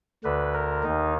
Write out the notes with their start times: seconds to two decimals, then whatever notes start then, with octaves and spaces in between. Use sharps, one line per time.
0.24 D2 D3 B4
0.54 A#4
0.83 D#2 D#3 D#4